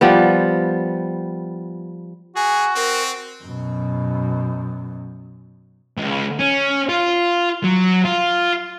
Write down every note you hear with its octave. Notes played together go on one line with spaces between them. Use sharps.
F3 G3 B3
F#4 G#4 G#5
C4 A#4
F#2 B2
C#2
C#4
F4
F#3
F4